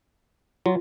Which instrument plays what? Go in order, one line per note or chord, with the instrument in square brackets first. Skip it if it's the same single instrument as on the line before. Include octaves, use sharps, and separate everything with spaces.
[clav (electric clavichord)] F#3 [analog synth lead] F4